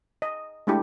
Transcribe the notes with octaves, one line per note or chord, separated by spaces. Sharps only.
D#5
G#3 A3 D4 E4 G4